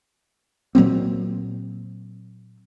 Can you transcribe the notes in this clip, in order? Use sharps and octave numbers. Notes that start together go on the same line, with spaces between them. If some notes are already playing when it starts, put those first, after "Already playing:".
A#2 F#3 A#3 C4